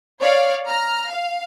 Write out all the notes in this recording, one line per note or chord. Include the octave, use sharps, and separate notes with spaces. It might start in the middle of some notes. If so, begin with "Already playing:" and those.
C#5 D5 F5
A#5 F6
F5